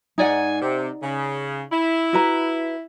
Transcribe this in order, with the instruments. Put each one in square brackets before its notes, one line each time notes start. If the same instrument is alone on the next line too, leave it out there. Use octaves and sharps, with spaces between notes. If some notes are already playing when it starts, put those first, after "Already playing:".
[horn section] G#2 G#5 [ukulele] D#4 D5 F#5
[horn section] C3
C#3
E4
[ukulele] F#4 B4 A#5